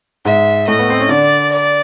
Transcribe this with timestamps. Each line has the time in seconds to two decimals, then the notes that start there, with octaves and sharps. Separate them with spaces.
0.25 G#2 G#3 E5
0.68 A2 A3 D#5
0.79 B3
0.90 C4
1.00 C#4
1.09 D3 D4 D5
1.52 D5